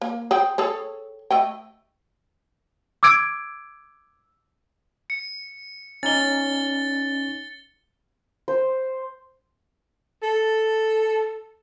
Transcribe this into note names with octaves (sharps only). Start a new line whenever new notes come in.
A#3
G#4 C5 G5
G#4 A4 C#5
A3 D#5 G5
D6 E6 G#6 D7
C#7
C#4 D#4 C#5 A6 G7
C5
A4